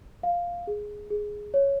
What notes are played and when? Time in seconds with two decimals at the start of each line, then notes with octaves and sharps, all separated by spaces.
0.23 F5
0.67 G#4
1.10 G#4
1.54 C#5